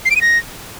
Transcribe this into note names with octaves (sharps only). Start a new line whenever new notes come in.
C7
D7
D#7
A#6